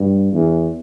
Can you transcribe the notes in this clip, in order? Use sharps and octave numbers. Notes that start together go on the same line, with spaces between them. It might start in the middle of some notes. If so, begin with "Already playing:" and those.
Already playing: G2
E2